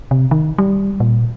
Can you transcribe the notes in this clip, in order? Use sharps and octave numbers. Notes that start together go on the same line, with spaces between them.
C3
D#3
G3
A#2